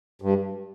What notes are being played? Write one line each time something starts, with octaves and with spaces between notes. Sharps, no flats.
G2